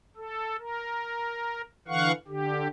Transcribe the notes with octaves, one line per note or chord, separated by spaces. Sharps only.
A4
A#4
D3 E3 F5 F#5 C#6
D3 G4